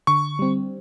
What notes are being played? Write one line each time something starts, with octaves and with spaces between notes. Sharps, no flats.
D3 C#6
G3 C4